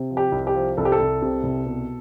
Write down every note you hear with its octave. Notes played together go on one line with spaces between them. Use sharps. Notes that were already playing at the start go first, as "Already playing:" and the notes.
Already playing: C3
F3
G4
C2
G4
F3
C2 A4
G4
A4
C2
C3
C2
B2